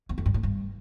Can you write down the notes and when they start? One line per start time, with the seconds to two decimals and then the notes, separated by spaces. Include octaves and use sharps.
0.09 E2
0.18 F2
0.26 G2
0.34 A2
0.43 G2